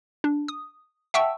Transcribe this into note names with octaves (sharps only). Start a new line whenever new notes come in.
D4
D#6
E5 F#5 G5 A5 C#6 E6